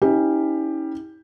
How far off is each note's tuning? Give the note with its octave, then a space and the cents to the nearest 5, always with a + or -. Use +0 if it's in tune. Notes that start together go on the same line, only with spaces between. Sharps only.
C#4 +0 E4 -45 G4 +10